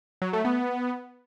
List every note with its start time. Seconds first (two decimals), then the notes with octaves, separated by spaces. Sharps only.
0.22 F#3
0.33 A3
0.45 B3